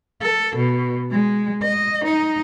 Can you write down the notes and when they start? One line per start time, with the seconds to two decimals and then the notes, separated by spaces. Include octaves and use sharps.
0.22 A4
0.56 B2
1.11 G#3
1.62 D#5
2.04 D#4